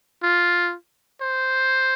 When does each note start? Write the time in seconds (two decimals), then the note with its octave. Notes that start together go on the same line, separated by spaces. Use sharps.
0.23 F4
1.21 C5